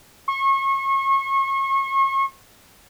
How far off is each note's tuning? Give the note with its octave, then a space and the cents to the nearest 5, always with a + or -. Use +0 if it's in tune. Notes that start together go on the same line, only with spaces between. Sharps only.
C#6 -35